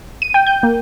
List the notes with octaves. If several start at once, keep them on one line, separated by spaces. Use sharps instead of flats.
D#7
G5
G6
A#3